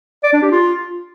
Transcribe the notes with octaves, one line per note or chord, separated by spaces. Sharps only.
D5
D4
G4
F4